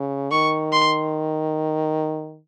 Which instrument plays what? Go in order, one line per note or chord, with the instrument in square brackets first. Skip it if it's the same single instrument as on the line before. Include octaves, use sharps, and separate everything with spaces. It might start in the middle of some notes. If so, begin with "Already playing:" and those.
Already playing: [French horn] C#3
[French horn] D#3 [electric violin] C#6
[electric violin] C6